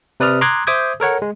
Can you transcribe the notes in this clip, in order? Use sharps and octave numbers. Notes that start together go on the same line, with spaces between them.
C3 B4 D5 D#6 F6
A#5 C6 D6 D#6 F#6 G#6
C5 E5 D6 D#6 G6 G#6
A4 A#4 C#5 F#5
G#3